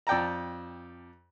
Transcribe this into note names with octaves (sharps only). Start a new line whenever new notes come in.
F2 D5 G5 A5 A#5